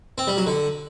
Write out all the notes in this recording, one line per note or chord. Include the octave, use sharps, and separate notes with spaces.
C4
G3
F#3
D3